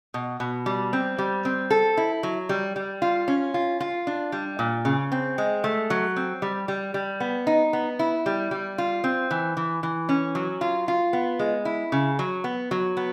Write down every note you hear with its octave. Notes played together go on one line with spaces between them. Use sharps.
B2
B2
G3
C4
G3
C4
A4
E4
F#3
G3
G3
F4
C#4
F4
F4
D4
G3
A#2
C#3
C4
G#3
A3
F#3
C4
G3
G3
G3
B3
D#4
B3
E4
G3
G3
F4
C4
E3
E3
E3
C#4
F#3
F4
F4
B3
G#3
E4
C#3
F#3
B3
F#3
B3